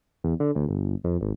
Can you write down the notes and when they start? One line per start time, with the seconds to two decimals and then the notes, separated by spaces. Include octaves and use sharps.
0.24 E2
0.40 D3
0.55 D2
0.69 G1
1.04 F2
1.21 G#1